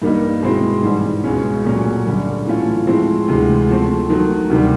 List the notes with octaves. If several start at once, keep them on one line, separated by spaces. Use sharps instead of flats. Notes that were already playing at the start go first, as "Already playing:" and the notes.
G2 D#3 G3 A#3 D#4
B2 G#3 C4 E4
G#2 E3 G3
C#2 B2 G#3 C#4
A#2 F#3 A3 C#4
F#2 D3 G3
A2 E3 A3 C#4 F4
A2 F3 G#3 C4 E4
D2 C3 E3 G#3
F3 A3 C4
D#3 F#3 A3
D2 C3 D#3 G3